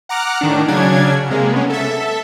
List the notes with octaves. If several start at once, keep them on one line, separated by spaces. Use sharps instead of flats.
F#5 A#5 D6 F6 F#6
A2 D#3 D4
C#3 F#3 C#4 D4 G#6
C3 G#3 A#3
B3 C#4
A4 E5